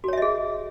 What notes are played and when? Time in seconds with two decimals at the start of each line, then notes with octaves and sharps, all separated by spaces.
0.04 F#4
0.08 C#5
0.13 E5
0.18 D#5
0.22 G#4